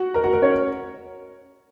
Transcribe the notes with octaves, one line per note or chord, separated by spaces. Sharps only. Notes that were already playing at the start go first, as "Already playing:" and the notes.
Already playing: F#4 F#5
A#4 A#5
F#4 F#5
A#4
C#4 C#5